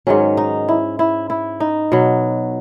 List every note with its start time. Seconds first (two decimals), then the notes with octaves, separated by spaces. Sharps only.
0.07 G#2 D#3 F#3 C#4
0.37 D#4
0.68 E4
0.99 E4
1.30 E4
1.60 D#4
1.92 B2 F#3